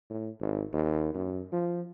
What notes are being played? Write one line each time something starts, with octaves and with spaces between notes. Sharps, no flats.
A2
G#1
D#2
F#2
F3